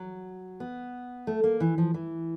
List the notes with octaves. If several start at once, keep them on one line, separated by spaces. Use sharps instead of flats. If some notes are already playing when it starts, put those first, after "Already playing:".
Already playing: F#3
B3
A3
A#3
E3
F3
E3